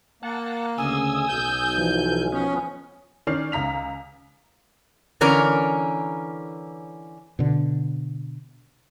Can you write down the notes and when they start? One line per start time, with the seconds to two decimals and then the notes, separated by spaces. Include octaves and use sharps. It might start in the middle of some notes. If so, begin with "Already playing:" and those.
0.23 A#3 F#5 A5
0.78 D2 C#3 G#5 D#6 E6
1.29 B1 G6
1.78 E3 F3
2.32 F3 B3 C#4
3.27 D#3 C#4 D5 F6 C7
3.52 C#2 A#5 B6 F7
5.21 D3 E3 C#4 A#4
7.39 B2 D3